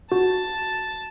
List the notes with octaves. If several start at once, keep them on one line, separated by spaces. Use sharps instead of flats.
F#4 A5